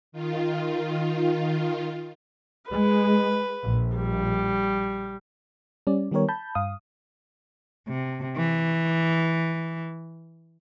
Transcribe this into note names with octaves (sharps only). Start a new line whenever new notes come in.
D#3 F4
G#3 B4
A#1
G3
G3 C#4 D5
D#3 G3 B3 G4 A#4 C#5
A5 B5 G6
G2 F5 D#6
C3
E3